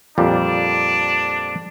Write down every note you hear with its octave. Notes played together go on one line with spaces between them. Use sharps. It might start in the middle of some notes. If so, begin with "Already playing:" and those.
F2 A#2 G3 D4